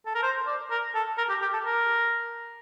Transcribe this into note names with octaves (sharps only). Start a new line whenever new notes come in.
A4
A#4
C5
D5
A#4
A4
A#4
G4
G4
A4
A#4